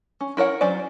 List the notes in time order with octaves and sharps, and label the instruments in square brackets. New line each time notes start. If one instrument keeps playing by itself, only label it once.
[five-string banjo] C#4
E4 A#4 C#5 F#5
F#3 C#4 C5 D5